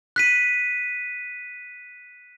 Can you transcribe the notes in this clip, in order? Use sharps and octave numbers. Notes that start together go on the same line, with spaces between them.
F#6 B6 D#7